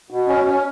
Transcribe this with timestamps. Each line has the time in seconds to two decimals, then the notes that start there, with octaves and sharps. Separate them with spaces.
0.10 B2
0.27 C#4
0.46 C#4